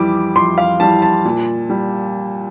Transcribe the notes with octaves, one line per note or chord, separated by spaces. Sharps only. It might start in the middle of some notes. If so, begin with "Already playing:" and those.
Already playing: F2 E3 G3 D6
F2 C6
F5
E3 G3 A5
A5
A#2
G3